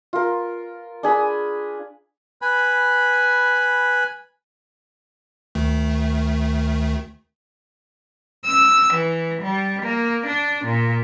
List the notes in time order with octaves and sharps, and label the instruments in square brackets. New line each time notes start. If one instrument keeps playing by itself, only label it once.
[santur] F4 A#4
D4 G#4 B5
[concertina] B4 G#5 B5
[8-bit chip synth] D2 D#3 A3
[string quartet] E6
E3
G3
A#3
D4
A#2